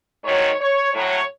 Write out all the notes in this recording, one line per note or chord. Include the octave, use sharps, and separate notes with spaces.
G#2 D#3 F#3 C#5
C#5
A2 F#3 C#5